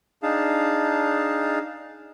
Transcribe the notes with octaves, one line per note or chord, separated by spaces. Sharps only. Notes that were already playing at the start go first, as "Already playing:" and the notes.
D4 D#4 G#4 F5 A5